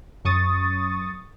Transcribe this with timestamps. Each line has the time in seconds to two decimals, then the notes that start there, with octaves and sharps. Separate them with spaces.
0.25 F#2 C#6 D#6 A6